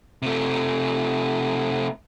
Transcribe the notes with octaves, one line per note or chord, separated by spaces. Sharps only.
C3 A3